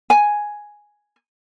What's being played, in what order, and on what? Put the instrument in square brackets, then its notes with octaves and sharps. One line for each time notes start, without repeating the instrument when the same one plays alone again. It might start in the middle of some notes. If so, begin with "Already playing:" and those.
[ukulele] G#5